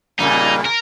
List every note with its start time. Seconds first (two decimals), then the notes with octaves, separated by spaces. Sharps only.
0.19 F2 A#2 C#3 G3 A#3 D#4
0.65 A#4